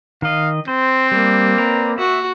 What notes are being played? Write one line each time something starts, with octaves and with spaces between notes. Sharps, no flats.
D#3 D#5 F5
C4 C5
G3 A#3
B4 D5 A#5
F#4 E5